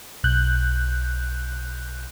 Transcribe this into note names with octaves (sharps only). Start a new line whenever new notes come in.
B1 F#6 G6